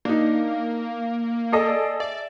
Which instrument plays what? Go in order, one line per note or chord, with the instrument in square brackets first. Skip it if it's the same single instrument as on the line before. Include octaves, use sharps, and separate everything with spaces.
[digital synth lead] A#3 [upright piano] D4 D#4
[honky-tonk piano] G#4 A4 D#5 [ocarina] D5
[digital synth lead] D5 [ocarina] E5